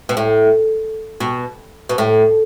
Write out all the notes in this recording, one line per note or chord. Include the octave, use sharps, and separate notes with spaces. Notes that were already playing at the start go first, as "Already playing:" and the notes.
B2
A2
B2
B2
A2